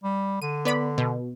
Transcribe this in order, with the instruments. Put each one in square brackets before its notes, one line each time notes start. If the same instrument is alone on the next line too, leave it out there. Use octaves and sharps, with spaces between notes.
[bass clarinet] G3
[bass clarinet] D3 [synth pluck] D#7
[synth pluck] B3 D5 B5
B2